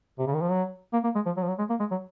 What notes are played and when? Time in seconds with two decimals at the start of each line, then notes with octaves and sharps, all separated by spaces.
0.19 C3
0.27 C#3
0.34 D#3
0.42 F3
0.50 F#3
0.93 A#3
1.04 A#3
1.15 G#3
1.26 F3
1.37 F#3
1.42 F3
1.48 F#3
1.59 G#3
1.70 A#3
1.80 G#3
1.91 F#3